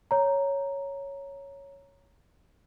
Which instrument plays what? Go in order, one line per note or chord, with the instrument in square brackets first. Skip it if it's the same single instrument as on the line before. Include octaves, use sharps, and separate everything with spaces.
[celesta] C#5 A#5